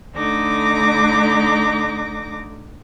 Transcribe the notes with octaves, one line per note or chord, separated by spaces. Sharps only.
D3 A3 D#4 D6 A#6